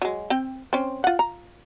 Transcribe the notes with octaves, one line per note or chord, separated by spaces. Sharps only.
F#3 G#3
C4 G5
C4 C#4
F4 F#5
A#5